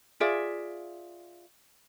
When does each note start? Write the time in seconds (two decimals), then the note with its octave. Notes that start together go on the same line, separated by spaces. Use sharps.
0.20 F4 G#4 D5 E5